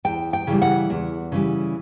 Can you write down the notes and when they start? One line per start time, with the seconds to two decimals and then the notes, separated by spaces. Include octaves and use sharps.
0.05 E2 G5
0.33 G5
0.47 C#3 E3 G3
0.62 F#5
0.90 E2
1.32 C#3 E3 G3